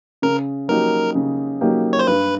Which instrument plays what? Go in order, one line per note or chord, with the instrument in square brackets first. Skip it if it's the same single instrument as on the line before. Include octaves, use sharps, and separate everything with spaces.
[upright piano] C#3 [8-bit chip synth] A#4
[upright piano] F#3 A#3 D#4 G4 [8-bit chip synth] A#4
[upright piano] C#3
F#3 A#3 D#4 G4
[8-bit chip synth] C#5
C5
[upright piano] G2 [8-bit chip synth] B4